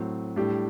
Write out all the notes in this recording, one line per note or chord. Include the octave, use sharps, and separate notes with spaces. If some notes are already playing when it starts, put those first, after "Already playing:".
Already playing: A2 F#3 C4
A2 G3 D4 G4